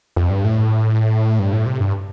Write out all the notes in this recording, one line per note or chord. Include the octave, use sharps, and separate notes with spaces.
F2
G2
A2
G2
A2
C3
G2